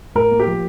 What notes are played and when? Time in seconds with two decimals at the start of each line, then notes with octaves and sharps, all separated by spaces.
0.15 A2 A#4
0.31 A#3
0.40 G4
0.47 F3